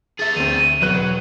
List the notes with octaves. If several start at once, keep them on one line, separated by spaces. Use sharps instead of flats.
G#4 E5 A6
D2 D3 C4 D#7
E1 F#3 B4 F#6